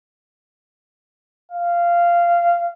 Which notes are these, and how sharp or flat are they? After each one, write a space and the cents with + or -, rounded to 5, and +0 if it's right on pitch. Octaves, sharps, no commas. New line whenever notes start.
F5 -15